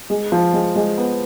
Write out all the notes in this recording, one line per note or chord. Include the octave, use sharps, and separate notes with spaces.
G#3
F3
G#3
G#3
B3